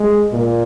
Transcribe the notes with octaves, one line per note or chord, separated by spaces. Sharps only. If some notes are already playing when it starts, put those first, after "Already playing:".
Already playing: G#3
A#2